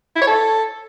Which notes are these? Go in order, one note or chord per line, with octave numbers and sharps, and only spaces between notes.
E4
C#5
A4